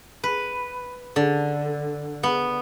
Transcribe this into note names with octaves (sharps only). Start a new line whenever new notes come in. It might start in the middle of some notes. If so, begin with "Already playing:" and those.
B4
D3
B3